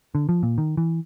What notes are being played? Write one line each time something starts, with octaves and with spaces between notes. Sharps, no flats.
D3
F3
A#2
D#3
E3